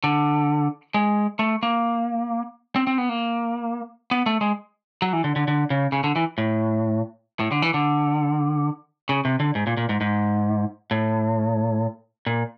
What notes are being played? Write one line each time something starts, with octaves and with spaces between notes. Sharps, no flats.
D3
G#3
A3
A#3
C4
C4
B3
A#3
B3
A3
G#3
F#3
E3
D3
D3
D3
C#3
C#3
D3
E3
A2
A2
D3
E3
D3
C#3
C3
D3
G#2
A#2
A#2
G#2
G#2
A2
A#2